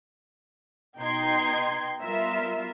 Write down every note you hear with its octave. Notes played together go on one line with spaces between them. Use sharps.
B2 D#4 G5 C6 G#6 C7
G3 B3 F4 A#4 E5